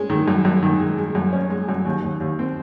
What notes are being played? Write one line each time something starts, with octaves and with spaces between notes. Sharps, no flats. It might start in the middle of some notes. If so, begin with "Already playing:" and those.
Already playing: G#3 C#4
D#3
F#2
F#2
D#3
G#3
G#3
F#2
C#4
G#3
F#2
D#2
D#2
D#2
C4